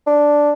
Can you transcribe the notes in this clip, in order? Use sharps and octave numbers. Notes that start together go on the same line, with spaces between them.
D4